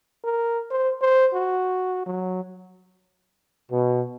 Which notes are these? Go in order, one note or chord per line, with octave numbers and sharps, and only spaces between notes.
A#4
C5
C5
F#4
F#3
B2